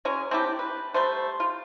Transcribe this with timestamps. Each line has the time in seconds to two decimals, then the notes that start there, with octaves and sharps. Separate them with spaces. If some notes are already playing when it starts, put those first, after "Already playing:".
0.05 F#3 G#3 C#4 G#4
0.31 C4 D4 E4 G4
0.59 B4
0.94 G3 A3 C5
1.40 F4